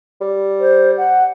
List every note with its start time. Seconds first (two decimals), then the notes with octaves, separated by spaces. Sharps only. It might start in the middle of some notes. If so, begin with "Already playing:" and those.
0.21 G3
0.59 C5
0.97 F#5